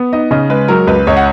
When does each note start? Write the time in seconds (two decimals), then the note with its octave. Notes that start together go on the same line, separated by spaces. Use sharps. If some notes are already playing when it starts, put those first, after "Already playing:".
Already playing: B3
0.13 D#4 D#5
0.31 C#3 D#5
0.49 G#3 B4
0.68 F#3 A#4
0.87 C#2 B4
1.07 C#2 C#5
1.17 F#5